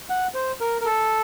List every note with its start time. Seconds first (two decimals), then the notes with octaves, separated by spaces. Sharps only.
0.10 F#5
0.34 C5
0.61 A#4
0.81 A#4
0.86 A4